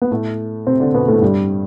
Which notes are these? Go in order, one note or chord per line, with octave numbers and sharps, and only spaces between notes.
B3
A2 A3
C3 C4
D3 D4
B2 B3
A2 A3
G2 G3